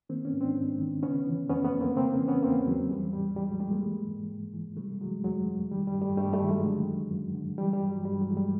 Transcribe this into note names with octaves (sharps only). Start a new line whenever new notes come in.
D#3 A#3 C4
B3 C#4
G#2
C4 D4
G#2
D#3
C#3 B3 C#4
E3
F2 B3 C#4
A3 B3
F2
A#3 C4
C#3 A#3 C4
B3 C#4
E3
B3 C#4
E2 A#3 C4
E2 F#3
E3 G3
A2 G3
A2 G3
F#3 G#3
E3 G3 A3
G#3 A#3
E3
G#2
G#2
E3
C3 G3 A3
E3 F#3 G#3
F2 F#3 G#3
F2
D#3 G3
G3
G2
G3 A3
G2 G3 A3
G3 A3
D#3
F#3 G#3
D3
F#2
F#2
D3
E3 G3
G3
G2
F#3
G2 G3
F#3 G#3
E3
G3 A3